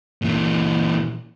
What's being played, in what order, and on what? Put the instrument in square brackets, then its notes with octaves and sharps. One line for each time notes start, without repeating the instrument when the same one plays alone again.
[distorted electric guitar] A#2 E3